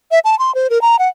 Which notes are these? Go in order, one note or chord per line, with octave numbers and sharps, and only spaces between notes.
E5
A5
C6
C5
A#4
A#5
F#5